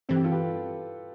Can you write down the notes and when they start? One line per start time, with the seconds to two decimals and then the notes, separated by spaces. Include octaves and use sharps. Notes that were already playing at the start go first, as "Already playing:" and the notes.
0.09 G2 E3 G3 C4 A4
0.16 G4
0.24 F4 A4
0.32 G4 B4